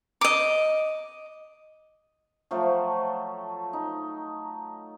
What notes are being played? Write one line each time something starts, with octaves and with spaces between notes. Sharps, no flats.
D#5 D6
F3 F#3 A3
D#4